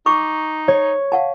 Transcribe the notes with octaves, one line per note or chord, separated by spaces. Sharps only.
D#4 C#6 D6
C#5
F5 F#5 A5